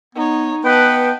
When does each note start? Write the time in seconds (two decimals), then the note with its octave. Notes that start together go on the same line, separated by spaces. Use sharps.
0.15 B3 D#4 C#5
0.65 B3 B4 D#5 G5 A5